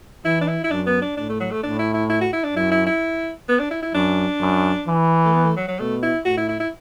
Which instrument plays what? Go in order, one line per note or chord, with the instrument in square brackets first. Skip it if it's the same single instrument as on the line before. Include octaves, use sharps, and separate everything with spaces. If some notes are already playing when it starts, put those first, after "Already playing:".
[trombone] E3 [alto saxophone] E4
[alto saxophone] D4
E4
E4
[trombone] F#2 [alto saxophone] D4
[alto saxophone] B3
D4
[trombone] A2 [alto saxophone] D4
[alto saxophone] A3
F#3
A3
[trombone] A2 [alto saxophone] D4
[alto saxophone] E4
E4
E4
F#4
E4
D4
[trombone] F#2 [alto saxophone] E4
[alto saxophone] E4
E4
B3
D4
E4
E4
[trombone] F#2 [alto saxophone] D4
[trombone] F#2
E3
[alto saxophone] A3
B3
A3
F#3
F#3
[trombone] B2 [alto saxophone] A3
[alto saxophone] E4
[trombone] A2 [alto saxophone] F#4
[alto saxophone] E4
E4
E4